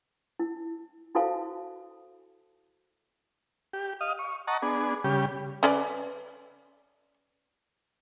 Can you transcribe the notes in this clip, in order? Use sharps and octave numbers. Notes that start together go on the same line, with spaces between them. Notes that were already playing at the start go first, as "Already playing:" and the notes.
E4
E4 F#4 A4 C5 F5 A5
G4
D#5 F5 D#6
C#6
D#5 F#5 A5 A#5 C#6
B3 D4 G#4
C#3 G3 G4
C#4 B4 D5